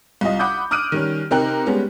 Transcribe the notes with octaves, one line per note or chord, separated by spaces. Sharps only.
C2 F4 D#5
F#5 B5 D6 D#6 G6
D6 D#6 F6 F#6 D7 D#7
D#3 G3 C#4
C3 D#4 A#4 G5 F#6
G3 G#3 B3 C#4 G4